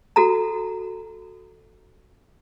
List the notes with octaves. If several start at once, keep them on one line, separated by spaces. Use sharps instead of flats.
F#4 A4 A#5